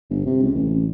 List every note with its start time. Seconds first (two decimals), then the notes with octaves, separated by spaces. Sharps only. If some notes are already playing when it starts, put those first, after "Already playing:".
0.10 G1
0.26 C3
0.43 C#2
0.54 A1